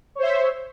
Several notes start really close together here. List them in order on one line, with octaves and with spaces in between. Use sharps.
C#5 C5 E5